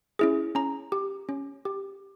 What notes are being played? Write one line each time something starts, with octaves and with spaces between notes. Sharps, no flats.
C#4 E4 G#4
C#4 A#5
G4
C#4
G4